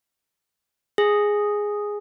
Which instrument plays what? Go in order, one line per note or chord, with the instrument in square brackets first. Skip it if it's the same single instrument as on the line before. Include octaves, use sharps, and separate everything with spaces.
[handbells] G#4